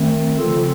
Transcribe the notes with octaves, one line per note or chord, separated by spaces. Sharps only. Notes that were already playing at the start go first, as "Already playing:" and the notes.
Already playing: D#3 A3 C4
C#3 F3 C4 F4 A4